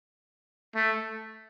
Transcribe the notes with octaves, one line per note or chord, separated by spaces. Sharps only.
A3